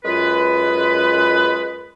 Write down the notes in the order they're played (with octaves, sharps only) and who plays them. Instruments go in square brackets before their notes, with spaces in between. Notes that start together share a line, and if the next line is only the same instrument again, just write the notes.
[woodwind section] F#2 G#3 F4 B4